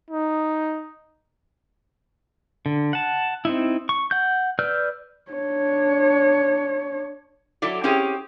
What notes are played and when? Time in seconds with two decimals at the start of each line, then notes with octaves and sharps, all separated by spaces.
0.11 D#4
2.66 D3
2.93 F#5 A5
3.45 C4 D#4 E4
3.89 C#6
4.11 F#5 G6
4.59 B4 D5 E6 F6 G6
5.31 D4 C#5
7.62 F#3 E4 A4 D5
7.84 C4 C#4 E4 G4 G#4